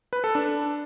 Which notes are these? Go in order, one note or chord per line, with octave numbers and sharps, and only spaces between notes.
B4
A4
D4